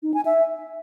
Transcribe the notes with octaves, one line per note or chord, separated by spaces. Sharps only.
D#4
G#5
E5